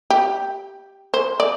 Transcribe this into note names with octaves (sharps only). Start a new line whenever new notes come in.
G4
C5
D5